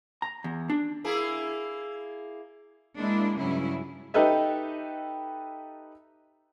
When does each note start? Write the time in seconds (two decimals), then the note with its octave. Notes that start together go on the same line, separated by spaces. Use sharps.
0.22 A#5
0.44 E2
0.70 D4
1.04 A#3 E4 G#4
2.96 G#3 A#3 D4 E4
3.38 G2 C#3 F#3 C#4 E4
4.14 D#4 G4 A4 B4 D#5 E5